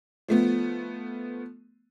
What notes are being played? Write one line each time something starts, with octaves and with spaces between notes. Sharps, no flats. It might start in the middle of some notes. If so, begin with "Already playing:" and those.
F3 A3 B3